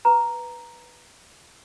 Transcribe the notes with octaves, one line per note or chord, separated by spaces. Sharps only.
B4 A#5